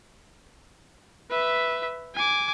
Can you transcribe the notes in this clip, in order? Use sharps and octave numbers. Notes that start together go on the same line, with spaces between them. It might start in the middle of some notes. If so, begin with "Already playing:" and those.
B4 E5
G#5 D6